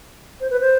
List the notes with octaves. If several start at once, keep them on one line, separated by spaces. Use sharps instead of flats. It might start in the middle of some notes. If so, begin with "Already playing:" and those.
C5
B4
C5